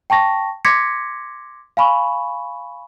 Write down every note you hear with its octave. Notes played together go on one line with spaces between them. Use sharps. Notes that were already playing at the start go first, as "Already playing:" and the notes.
G5 A5 C#6 A#6
C6 D6 G#6 A#6 B6 C#7
F5 G#5 B5 C#6